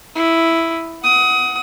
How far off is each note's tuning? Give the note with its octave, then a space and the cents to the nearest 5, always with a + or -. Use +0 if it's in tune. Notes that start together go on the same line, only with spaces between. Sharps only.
E4 +0 D#6 +0
F#5 +0 D#6 +25